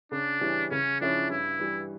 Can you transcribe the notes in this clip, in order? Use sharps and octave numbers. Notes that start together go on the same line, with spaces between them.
C#3 D4
E3 G3 C#4
C#3 C#4
F3 C#4 D4 E4
G2 E4
E3 G3